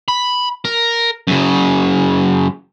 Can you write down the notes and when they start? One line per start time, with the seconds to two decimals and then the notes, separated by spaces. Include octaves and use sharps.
0.08 B5
0.65 A#4
1.27 F#2 C#3